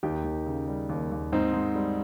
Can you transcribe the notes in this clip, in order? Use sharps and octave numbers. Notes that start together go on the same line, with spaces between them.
D#2 D#4 G4
D#2
C#3
G3
D#2
D#2
G#2 C4 D#4
G#2
G3